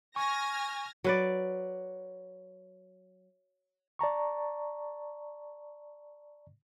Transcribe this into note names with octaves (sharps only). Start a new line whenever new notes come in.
G#5 C#6 F6 G#6 A#6
F#3 B4 D5
D5 A5 A#5 C#6